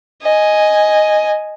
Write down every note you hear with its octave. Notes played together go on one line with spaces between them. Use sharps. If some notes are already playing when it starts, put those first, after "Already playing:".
D#5 G#5